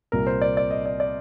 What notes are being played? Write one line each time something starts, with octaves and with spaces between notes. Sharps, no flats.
C2 A#2 G3 A#4
C5
D5
D5
D#5
D5
D5